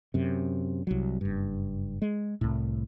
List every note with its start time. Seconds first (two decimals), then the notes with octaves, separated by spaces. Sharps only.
0.14 F#2 C3
0.87 C2 F#3
1.21 F#1 G2
2.02 G#3
2.41 C2 A2